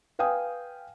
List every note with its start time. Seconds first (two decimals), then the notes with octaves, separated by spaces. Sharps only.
0.19 B4 F5 G5 G#5 D#6